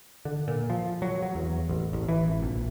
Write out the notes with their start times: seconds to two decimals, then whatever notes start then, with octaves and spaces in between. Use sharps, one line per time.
0.25 D3
0.48 A#2
0.70 F3
1.02 F#3
1.23 F#3
1.35 E2
1.69 A1
1.93 A1
2.08 E3
2.28 G#1
2.42 A#1